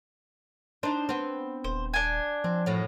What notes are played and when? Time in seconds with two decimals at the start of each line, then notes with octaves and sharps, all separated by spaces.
0.83 D4 D#4 C5
1.09 B3 C4
1.64 D#1 C5
1.94 D4 G#5
2.44 F3 C4
2.66 F#2 A2 F#3